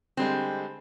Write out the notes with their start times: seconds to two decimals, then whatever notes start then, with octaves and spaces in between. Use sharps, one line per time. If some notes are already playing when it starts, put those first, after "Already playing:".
0.17 D3 G3 G#3 C4